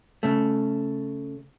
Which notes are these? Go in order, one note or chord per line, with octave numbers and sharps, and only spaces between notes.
C#3 A3